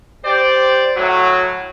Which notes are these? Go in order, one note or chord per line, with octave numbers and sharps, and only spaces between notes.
G4 C5 D5
A2 F#3